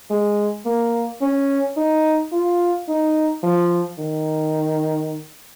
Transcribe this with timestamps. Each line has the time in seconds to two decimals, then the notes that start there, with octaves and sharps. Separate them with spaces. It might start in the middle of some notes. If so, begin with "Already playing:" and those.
0.10 G#3
0.65 A#3
1.22 C#4
1.77 D#4
2.32 F4
2.88 D#4
3.43 F3
3.99 D#3